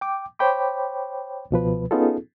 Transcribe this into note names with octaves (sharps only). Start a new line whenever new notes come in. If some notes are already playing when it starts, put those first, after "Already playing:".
G5 D6
C5 C#5 G5 B5 D6
C#2 B2 F3 B4
B3 C#4 D#4 F4 G#4 A4